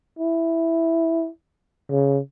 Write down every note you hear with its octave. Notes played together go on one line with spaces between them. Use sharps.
E4
C#3